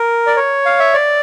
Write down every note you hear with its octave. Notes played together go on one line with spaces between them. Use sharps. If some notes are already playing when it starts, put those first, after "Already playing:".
Already playing: A#4
D5
C#5
F5
E5
D5